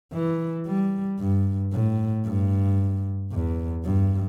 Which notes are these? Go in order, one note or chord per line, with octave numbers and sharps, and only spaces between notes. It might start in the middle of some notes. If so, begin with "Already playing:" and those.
E3
G3
G2
A2
G2
E2
G2